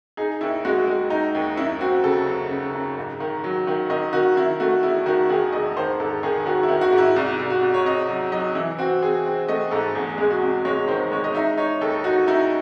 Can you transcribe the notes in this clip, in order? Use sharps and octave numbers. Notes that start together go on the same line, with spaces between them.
D#4 G#4
D#2 E4
G#3 F#4
G#3
D#4
D#2
F#2 E4
C4 F#4
C#3 A4
F#2
C#3
F#2
G#2
D#3
F#3
D#3
D#3 D#5
D#3 F#4
D#3 E4
A3 F#4
E1 E4
D#3 F#4
D#3 G#4
E1 D#5
D#3 C5
G#2 A4
D#3 G#4
D#3 F#4
E4
D#3
F#4
G#2
E4
C2 F#4
C2
F#4
C2
C#5
C3 D#5
F#3
F#3 D#5
E3 E4
C4 F#4
C4 G#4
C4
A3 D#5
G#2 A4
E2 G#4
G#3 G#4
F#4
C3
G#3 C#5
D#3 C5
G#3 C#5
D#5
D#4 E5
D#4 C#5
D#2 A4
D#4 F#4
D#4 E4